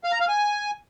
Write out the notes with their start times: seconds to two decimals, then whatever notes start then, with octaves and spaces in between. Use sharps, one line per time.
0.04 F5
0.12 A#5
0.20 F5
0.28 G#5